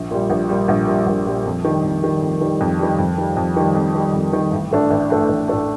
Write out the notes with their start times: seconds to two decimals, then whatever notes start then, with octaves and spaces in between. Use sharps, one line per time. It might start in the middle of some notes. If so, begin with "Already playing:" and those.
Already playing: A#1
0.11 A#2 G3
0.30 A#1
0.49 A#2 G3
0.68 A#1
0.87 A#2 G3
1.07 A#1
1.26 A#2 G3
1.46 F2
1.65 D#3 G3
1.83 F2
2.03 D#3 G3
2.22 F2
2.41 D#3 G3
2.61 F2
2.79 D#3 G3
2.99 F2
3.18 D#3 G3
3.37 F2
3.57 D#3 G3
3.75 F2
3.95 D#3 G3
4.14 F2
4.33 D#3 G3
4.52 A1
4.71 A2 A3 D4
4.90 A1
5.10 A2 A3 D4
5.29 A1
5.48 A2 A3 D4